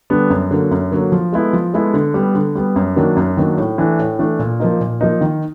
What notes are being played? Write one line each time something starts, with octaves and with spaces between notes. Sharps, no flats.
D3 G3 B3 D4
F#2
D3 F#3 A#3
F#2
D3 F#3 A#3
F3
G#3 B3 E4 A4
F3
G#3 B3 E4 A4
D3
G3 B3
D3
G3 B3
F#2
D#3 F#3 A#3 D4
F#2
D#3 F#3 A#3 D4
A2
E3 A3 D4
A2
E3 A3 D4
A#2
F3 A#3 D#4
A#2
F3 A#3 D#4
D#3